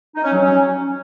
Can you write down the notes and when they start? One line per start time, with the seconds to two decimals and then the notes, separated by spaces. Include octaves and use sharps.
0.15 D#4
0.23 C#4
0.32 F#3
0.40 C#4